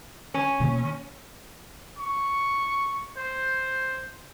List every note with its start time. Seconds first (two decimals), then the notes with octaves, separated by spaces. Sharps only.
0.34 C#4
0.60 B2 D#3 A#3
1.98 C#6
3.17 C5